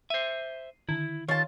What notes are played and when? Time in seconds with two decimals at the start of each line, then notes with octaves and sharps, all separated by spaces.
0.10 C5 E5 C7 D#7
0.89 D3 D#3 E4
1.29 D#3 F4 C#5 A5